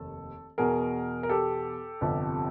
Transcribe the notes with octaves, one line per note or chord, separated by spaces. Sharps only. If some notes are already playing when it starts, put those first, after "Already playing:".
Already playing: F1 D#2 A4
E2 B2 G#4 A#4
A#4
G4 A4
G1 F2 C3 F3